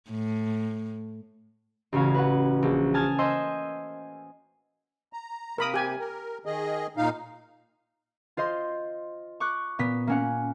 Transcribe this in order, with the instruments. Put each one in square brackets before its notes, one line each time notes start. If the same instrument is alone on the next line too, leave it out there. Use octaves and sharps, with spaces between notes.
[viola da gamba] A2
[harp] A1 C#3 C#4 F#4 F5
B4 F#5
A#1
G#5 A5 D#6 F6 G#6 A6
C5 D#5 G#5 C6 E6
[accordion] A#5
[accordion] C3 A#3 [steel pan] A#4 B5 D#6
[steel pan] G4 G#5
[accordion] A#4
D#3 G#4 D#5
A#2 D#4 F5
[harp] F4 C5 D#5 C6
C#6 D6 F#6
A#2 B3 B6
A#3 C#4 F#5